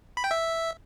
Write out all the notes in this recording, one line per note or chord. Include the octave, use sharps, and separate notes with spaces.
B5
G5
E5